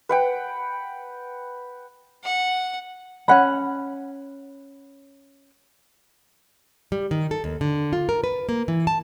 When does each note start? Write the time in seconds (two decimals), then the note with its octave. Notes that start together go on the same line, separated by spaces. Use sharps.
0.09 B4 F#5 G5
2.24 F#5
3.28 C#4 F#5 B5
6.92 G3
7.11 D#3
7.31 A4
7.44 D#2
7.61 D3
7.93 F4
8.09 A#4
8.24 B4
8.49 A#3
8.68 E3
8.87 A5